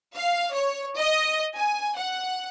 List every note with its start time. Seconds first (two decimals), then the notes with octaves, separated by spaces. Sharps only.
0.16 F5
0.53 C#5
0.96 D#5
1.56 G#5
1.97 F#5